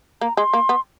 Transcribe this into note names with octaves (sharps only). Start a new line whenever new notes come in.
A#3 A#5
G#3 C6
A#3
B3